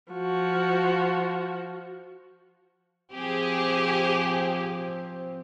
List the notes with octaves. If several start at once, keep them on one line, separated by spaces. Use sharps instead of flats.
F3 F#4
F3 C4 G4 G#4